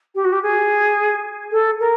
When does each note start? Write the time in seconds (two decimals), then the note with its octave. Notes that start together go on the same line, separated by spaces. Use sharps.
0.15 G4
0.24 F#4
0.32 G4
0.42 G#4
1.51 A4
1.80 A#4